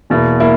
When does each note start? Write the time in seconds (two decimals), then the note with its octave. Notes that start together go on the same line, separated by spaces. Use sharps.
0.10 E2 B2 A#3 E4
0.40 A#3 E4